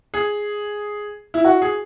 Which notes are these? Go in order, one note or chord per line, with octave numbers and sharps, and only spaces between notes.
G#4
E4
F#4
G#4